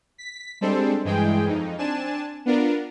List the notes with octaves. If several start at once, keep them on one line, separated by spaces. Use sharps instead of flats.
B6
G3 G#3 C4 D4 A4 C5
G2 E3 G#3 G#4 G5
F2 D#4
C4 D4 G#5 A5 E7
B3 D4 F4 A#4